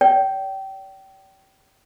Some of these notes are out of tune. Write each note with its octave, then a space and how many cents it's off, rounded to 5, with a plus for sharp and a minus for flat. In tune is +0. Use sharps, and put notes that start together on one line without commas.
D5 -45 G5 -25